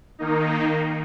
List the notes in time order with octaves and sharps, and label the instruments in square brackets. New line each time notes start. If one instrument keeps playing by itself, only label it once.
[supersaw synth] D#3 A#3 D#4